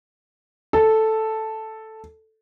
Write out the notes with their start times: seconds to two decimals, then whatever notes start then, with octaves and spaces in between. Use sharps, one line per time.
0.73 A4